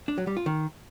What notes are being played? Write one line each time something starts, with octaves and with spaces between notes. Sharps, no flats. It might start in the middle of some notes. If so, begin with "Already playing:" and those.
D4
F#3
G3
F4
D#3